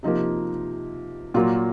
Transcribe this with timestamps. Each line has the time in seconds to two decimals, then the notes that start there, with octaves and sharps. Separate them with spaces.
0.03 C3 F3 A#3 D#4
1.34 A#2 F#3 A#3 F4